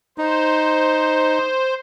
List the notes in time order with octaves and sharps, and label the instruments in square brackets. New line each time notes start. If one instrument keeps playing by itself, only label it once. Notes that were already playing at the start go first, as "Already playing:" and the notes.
[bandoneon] D#4 [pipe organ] C5